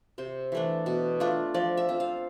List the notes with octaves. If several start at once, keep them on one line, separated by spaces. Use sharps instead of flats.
C3 C5
E3 A3 D4
B2
A3 D4 F4
F3 D5
E5
C4 F4
F5